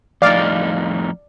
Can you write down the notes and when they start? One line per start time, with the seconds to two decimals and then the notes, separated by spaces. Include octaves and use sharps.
0.22 F2 A2 D#4 D5 F5